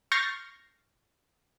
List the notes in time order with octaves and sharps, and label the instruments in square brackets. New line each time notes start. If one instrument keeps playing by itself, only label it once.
[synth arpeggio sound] C#6 F6 G6 A6 A#6 C7